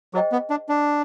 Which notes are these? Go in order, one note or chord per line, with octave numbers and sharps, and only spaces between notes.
F#3 G#4 C5 D#5 G5
B3
D4
D4